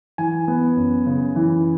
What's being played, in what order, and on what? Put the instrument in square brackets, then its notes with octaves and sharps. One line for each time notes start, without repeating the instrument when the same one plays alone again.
[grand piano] E3 G#5
B3
F#2
C#3
E3